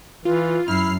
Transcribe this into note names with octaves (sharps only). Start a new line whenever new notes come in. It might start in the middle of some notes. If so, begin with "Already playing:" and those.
E3 F4
F#2 E4 F6 C7